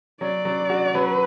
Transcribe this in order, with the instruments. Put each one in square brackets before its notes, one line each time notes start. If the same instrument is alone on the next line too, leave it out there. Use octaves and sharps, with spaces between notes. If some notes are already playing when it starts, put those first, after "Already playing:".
[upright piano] F#3 [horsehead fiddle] D5
[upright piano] F#3
F#4
[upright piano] F#3 [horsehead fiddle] B4